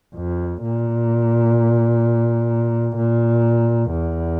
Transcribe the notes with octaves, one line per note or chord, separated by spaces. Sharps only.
F2
A#2
A#2
E2